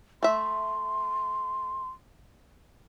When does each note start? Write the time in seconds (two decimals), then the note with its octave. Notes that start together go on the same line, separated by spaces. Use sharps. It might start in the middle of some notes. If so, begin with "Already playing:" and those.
0.23 A3 E5 C6